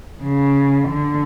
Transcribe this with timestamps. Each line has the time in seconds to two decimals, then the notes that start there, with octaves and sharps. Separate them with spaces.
0.23 C#3
0.88 D3